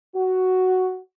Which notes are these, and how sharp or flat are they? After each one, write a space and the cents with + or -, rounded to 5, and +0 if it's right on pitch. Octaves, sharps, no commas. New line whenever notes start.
F#4 +5